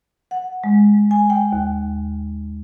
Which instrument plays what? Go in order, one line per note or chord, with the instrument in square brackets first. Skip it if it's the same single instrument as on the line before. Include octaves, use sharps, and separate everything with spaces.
[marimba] F#5
G#3
G#5
G5
D#2